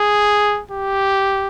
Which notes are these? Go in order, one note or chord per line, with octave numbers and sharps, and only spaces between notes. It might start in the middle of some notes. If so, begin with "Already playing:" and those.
Already playing: G#4
G4